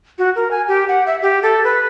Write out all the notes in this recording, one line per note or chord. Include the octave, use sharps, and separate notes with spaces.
F#4
A#4
G#5
G4
F#5
E5
G4
A4
B4